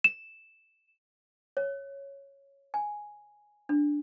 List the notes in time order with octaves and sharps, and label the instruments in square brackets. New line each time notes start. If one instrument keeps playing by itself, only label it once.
[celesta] E7
[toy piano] C#5
G#5
D4